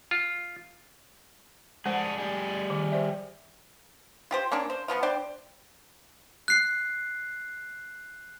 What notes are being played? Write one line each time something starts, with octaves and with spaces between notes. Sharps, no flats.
F4
G#3 D4 G#4 C5 F#5
G3 G#4
D#3
C5 D5 E5
F4 G4 C5
A#3 C#4 D4
C5
B2 F3 B3 F4
D4 C5 D5 G5
F#6 C7